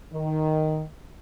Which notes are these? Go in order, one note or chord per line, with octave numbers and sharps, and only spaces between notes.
D#3